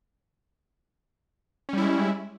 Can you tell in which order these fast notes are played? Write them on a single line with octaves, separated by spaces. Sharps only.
C#4 G3 E4 G#3